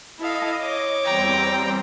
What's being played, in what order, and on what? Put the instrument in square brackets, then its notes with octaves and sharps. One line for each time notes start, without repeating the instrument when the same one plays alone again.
[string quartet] E4 A4 F5 [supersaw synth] D#5
[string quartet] C#5 D6
[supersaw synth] E2 G3 C4 [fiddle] G5 A#5